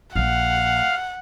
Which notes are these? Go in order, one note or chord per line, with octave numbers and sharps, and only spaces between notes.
A#1 F5 F#5